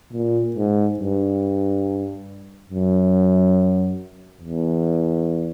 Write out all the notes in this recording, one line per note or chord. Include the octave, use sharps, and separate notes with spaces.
A#2
G#2
G2
F#2
E2